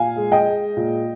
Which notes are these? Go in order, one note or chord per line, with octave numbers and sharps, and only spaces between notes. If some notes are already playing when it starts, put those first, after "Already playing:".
Already playing: A#2 F5 G#5
G#3
D#5 G5
G#3
A#2